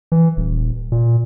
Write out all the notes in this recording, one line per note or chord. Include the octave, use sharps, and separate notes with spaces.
E3
D#1
A#2